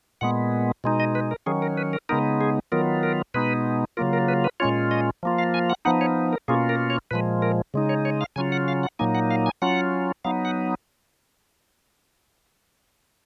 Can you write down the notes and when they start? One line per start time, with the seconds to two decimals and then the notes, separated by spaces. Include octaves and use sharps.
0.21 A#2 G#3 B3 F#5
0.84 B2 G#3 D#4
1.00 D#5
1.15 B4
1.31 A#4
1.46 D#3 F#3 C#4 G#4
1.62 A#4
1.77 B4
1.93 A#4
2.09 C#3 G#3 B3 D#4 A#4
2.41 G#4
2.72 D#3 F#3 B3 F4 A#4
3.03 A#4
3.34 B2 G#3 B3 D#4 B4
3.97 C#3 F#3 A#3 F4 A#4
4.13 A#4
4.28 B4
4.44 B4
4.60 A#2 G#3 C#4 F4 C#5
4.91 D#5
5.23 F3 A#3 F4
5.38 F5
5.54 G#5
5.70 F#5
5.85 F3 B3 D#4 F#5
6.01 C#5
6.33 A#4
6.48 B2 A#3 C#4 F4 G#4
6.69 A#4
6.90 C#5
7.11 A#2 F3 G#3 B4
7.42 A#4
7.74 C#3 G#3 D#4
7.89 C#5
8.05 C#5
8.21 F5
8.36 C#3 F#3 C#4 F4 G#5
8.52 F#5
8.68 F5
8.83 F#5
8.99 A#2 F#3 A#3 D#4 G#5
9.15 F#5
9.31 F5
9.46 G#5
9.62 F#3 C#4 F4 F#5
10.24 F#3 B3 D#4 F5
10.45 F#5